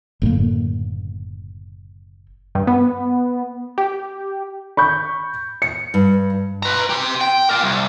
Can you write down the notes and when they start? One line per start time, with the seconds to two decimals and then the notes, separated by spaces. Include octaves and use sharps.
0.22 F#1 A2 D3 A#3
2.55 G2
2.67 B3
3.78 G4
4.77 B5 C#6 G6
5.62 C#7
5.94 G2
6.63 B4 A#5
6.90 G4 C6
7.21 G5
7.49 A#4 D5
7.62 C2